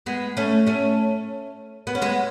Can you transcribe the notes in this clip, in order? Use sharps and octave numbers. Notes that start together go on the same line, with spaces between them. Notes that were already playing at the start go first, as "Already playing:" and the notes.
G#3 B3
A3 C#4
A3 C#4
B3
C#4
G#3 B3